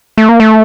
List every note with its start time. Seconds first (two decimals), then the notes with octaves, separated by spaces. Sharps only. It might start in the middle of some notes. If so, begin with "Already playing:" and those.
0.17 A3
0.29 A#3
0.40 A3